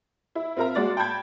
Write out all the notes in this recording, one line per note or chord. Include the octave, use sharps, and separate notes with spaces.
E4
C4 F4 A#4 E5 A#5
G#3 F#4 D5 A6
G5 A5 B5 G6 G#6